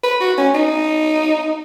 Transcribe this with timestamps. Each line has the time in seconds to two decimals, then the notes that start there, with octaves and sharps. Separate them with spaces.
0.03 B4
0.20 F#4
0.37 C#4
0.55 D#4